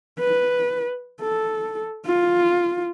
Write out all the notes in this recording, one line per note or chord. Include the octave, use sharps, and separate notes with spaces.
B4
A4
F4